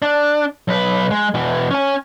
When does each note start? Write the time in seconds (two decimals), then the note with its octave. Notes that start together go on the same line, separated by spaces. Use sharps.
0.02 D4
0.68 B1 B4
1.11 G#3
1.34 B2 E3
1.71 C#4 G#5